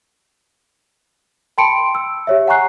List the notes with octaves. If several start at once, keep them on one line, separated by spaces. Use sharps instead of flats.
G5 A5 B5 C6 C#7 D7
E6
G4 C#5 E5
F#5 G#5 A#5 C#6 F#6 C7